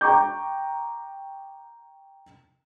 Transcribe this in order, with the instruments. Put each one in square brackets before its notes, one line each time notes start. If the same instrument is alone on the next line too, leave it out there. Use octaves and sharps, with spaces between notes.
[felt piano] G5 A#5 C#6 D6 G6